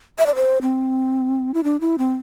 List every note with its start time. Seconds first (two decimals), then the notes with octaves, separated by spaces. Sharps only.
0.18 E5
0.26 D5
0.35 C5
0.62 C4
1.54 E4
1.64 D4
1.81 E4
1.98 C4